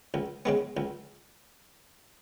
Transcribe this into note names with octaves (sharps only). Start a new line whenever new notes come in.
C#2
C#3 G#3 B3
C#2